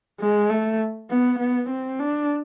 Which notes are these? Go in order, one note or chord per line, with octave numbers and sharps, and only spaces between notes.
G#3
A3
B3
B3
C4
D4